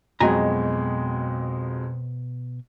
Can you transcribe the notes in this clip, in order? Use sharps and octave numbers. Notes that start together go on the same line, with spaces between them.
F2 B2 F#3 G#3 G#5 A#5